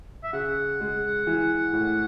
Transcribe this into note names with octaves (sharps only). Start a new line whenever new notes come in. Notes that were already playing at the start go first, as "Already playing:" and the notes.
E5
C#3 F#5
G#3
E3
A2